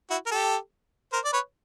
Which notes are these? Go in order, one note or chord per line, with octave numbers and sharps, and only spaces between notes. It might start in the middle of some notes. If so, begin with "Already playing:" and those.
E4 F#4
A#4
G4 A4
A#4 C5
D5
B4 C#5